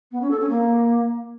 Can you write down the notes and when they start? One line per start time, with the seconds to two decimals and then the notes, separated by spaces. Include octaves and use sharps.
0.11 B3
0.21 C#4
0.30 A4
0.40 C#4
0.49 A#3